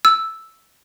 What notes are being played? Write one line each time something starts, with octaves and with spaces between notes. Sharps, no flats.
E6